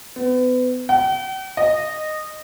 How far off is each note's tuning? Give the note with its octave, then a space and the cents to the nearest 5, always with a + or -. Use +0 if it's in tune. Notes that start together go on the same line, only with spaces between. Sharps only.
B3 +35
G5 -45
D#5 -15